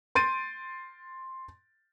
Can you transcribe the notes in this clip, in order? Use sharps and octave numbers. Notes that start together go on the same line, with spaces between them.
C6 G6 A6 D7 D#7